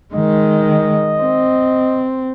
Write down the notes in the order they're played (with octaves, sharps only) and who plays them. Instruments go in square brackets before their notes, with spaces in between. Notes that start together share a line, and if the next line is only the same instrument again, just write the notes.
[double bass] D#3 G#3 [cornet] D#5
[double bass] C4